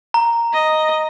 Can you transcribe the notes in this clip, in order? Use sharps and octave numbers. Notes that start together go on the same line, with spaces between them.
A#5
D#5